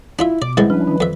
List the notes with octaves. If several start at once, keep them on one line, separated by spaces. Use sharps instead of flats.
D4 E4 F4 E5
B2 D5 D6
A1 C3 G3 G#3 E4 B4 A6
F3 C#4 D4 E4 B4
D#3 E3
F2 E5